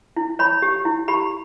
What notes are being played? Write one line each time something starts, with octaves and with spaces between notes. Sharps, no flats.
E4
C#5 B5
G4
E4
G4 B5